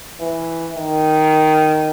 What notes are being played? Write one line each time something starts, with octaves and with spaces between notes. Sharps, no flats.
E3
D#3